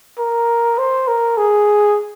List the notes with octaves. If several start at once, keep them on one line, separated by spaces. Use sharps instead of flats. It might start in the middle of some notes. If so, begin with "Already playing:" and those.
A#4
C5
A#4
G#4